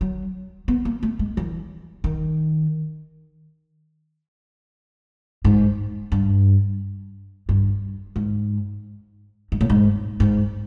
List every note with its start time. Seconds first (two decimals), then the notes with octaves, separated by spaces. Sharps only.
0.01 F#3
0.68 B3
0.85 A#3
1.03 A3
1.19 G#3
1.37 E3
2.04 D#3
5.45 G#2
6.12 G2
7.49 G2
8.16 G#2
9.52 G#2
9.61 A2
9.70 G#2
10.20 G#2